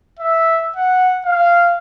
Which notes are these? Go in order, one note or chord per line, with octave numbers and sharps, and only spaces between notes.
E5
F#5
F5